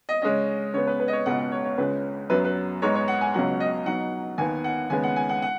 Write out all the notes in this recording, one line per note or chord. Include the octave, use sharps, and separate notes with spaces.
D#5
C#3 G#3 C#4 D#5
C#3 G#3 B3 C#5
B4
B4
D#5
C#5
C#2 B2 G#3 B3 F#5
F#5
C#5
C#5
C#2 C#3 G#3 B4
F#2 F#3 B3 B4
B4
G#2 G#3 B3 D#4 C#5
C#5
F#5
G#5
C#2 B2 F#3 C#4 F#5
D#5
B2 F#3 D#4 F#5
D#2 D#3 B3 G#5
F#5
D#2 C#3 G#3 B3 G#5
F#5
G#5
F#5
F#5